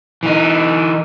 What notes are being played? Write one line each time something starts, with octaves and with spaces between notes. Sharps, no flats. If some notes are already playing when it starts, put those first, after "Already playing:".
E3 D#4